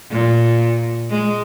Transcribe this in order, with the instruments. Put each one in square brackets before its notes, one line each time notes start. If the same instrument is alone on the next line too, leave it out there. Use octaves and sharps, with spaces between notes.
[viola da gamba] A#2
G#3